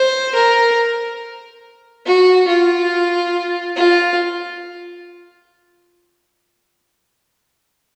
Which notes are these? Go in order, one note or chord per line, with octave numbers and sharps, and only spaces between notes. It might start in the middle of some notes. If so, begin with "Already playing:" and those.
Already playing: C5
A#4
F#4
F4
F4